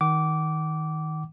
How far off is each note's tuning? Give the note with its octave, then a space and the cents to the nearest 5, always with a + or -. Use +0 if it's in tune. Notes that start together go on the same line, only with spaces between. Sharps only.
D#3 +15 F#5 +40 D6 -15